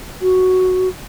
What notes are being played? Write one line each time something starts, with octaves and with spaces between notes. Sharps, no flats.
F#4